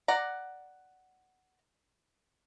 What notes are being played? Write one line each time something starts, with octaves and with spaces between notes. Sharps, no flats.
D5 F#5 A#5